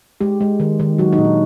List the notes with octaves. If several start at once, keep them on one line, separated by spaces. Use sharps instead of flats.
G#3 G4
G#3
D#3
D#3
F#3 F#4
D#4
A#2
D4